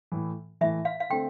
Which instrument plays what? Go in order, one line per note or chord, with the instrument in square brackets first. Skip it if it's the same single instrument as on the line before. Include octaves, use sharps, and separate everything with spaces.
[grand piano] A2 E3 A3
[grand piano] A2 E3 A3 [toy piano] E5
[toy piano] F5
F5
[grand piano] D3 A3 C4 [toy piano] G5